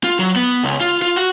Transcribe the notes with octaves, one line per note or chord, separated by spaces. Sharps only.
F4
F#3
B3
C#2
F4
F4
F#4